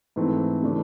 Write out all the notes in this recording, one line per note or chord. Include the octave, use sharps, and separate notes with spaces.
G#2 E3 A3 C4
C#3 E3 A3 D4